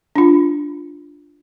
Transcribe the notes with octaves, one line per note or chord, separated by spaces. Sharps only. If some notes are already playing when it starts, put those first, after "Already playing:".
D4 F4